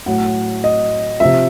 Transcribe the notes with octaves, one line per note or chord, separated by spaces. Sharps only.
A2 F#3 F#5
D#5
C3 F3 E5